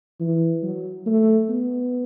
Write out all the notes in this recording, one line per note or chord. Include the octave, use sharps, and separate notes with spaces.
E3
F#3
A3
B3